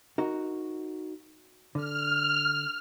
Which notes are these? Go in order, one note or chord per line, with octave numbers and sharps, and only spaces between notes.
D#4 F#4 A#4
D3 F6